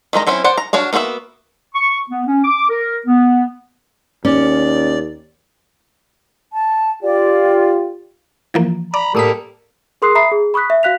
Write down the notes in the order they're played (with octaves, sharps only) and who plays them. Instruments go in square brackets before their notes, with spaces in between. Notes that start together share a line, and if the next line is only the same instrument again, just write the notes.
[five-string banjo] D#3 G3 G#3 A#5
F#3 C4 C#4 E4
C5 D5 F#5
A#5
D4 F#4 C#5 F5
A#3 B3 F#4 C5 E5
[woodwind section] C#6
B3
C#4
D6
A#4
B3
[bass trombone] D#2 [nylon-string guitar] C#4 [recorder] D5
[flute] A5
[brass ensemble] F4 G4 [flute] D5
[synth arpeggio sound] E3 F3 A#3
[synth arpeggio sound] D5 [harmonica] A#5 B5
[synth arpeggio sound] A2 D#6 B6 [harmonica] G3 A#3 A4
[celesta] G#4 A#4 C6 D#6 F#6 C7
E5 A#5 B5 D#6 C7
G#4
B5 C#6 D#6 F#6 B6
E5
F#4 F5 F#6 B6 F7